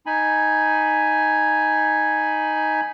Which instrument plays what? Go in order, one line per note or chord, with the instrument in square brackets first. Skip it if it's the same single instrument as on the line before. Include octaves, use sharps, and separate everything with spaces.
[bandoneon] D#4 G#5 B5